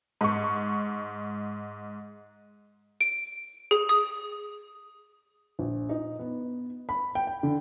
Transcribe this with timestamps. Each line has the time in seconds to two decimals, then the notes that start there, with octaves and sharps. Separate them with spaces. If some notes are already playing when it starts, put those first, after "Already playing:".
0.21 G#2 C#6
3.01 D7
3.71 G#4
3.89 D#6
5.59 A#1
5.89 D#4
6.19 B3
6.89 B5
7.15 G5
7.27 G5
7.43 D3